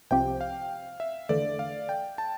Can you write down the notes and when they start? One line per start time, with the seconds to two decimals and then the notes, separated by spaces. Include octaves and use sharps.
0.11 C2 C3 F3 C4 G4 G5
0.41 F5
1.00 E5
1.29 E2 D3 A3 D5
1.59 F5
1.89 G5
2.18 A5